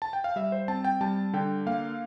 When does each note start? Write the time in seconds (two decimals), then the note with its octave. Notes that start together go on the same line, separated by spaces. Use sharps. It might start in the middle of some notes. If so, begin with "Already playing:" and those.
0.02 A5
0.13 G5
0.24 F5
0.36 G3 E5
0.52 C5
0.68 C4 A5
0.84 G5
1.01 G3 A5
1.33 D3 G5
1.66 A#3 F5